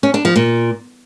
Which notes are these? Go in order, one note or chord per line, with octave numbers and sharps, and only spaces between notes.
C#4
D4
F3
A#2